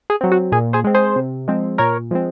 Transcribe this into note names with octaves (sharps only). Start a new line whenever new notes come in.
G#4
F#3 C4
F#4
A#2 G#4
G#4 C5
G#3 C4
G#4 C5
C3
F3 G#3 C4
A#2 A#4 C#5
F3 G#3 C4